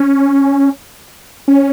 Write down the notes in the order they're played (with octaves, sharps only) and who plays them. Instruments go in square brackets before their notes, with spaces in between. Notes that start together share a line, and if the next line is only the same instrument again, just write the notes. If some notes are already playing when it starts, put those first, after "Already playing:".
Already playing: [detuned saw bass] C#4
C#4